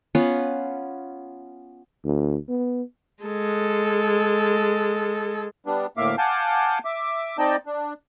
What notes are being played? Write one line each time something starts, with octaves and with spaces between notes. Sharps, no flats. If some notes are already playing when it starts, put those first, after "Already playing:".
B3 C#4 F4 B4
D2
B3
G#3 A4
G3 B3 D4
D2 A2 A#3 E5 F5 D6
F5 F#5 G#5 A5 D6 G6
E5 D6
C4 D#4 D5 D#5 G5 A5
D4